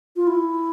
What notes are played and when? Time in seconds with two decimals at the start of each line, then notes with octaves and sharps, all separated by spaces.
0.16 F4
0.27 E4